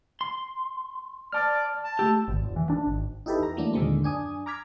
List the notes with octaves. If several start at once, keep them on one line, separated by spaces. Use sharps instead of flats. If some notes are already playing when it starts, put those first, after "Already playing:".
C6
D5 A5 F6
A5
A3 G4 E6
G#1
F1
E3
D4
G#1
D#4 E4 G4 A4 B4
E2 A#5
E3 F#3 A3 A#3 D4
D#2 A#2 D3 G#3 C4
F#2 D4 G#5 D#6
A#5 D6 F6 G#6 B6